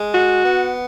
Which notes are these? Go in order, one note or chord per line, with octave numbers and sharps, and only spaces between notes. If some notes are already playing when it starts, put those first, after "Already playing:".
Already playing: G#3
F#4
B3